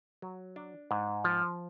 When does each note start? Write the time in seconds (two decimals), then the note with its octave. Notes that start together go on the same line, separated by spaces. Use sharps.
0.22 F#3
0.56 D4
0.91 G#2
1.24 F3